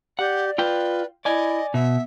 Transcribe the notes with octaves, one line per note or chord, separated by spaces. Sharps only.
G4 D5 F#5
F4 B4 G5
E4 D5 D#5 G#5
B2 B3 E5